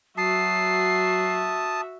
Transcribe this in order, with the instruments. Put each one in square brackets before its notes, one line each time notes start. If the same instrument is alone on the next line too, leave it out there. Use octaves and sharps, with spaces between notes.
[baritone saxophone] F#3 [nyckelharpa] F#4 E5 [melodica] A5 D#6 [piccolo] C7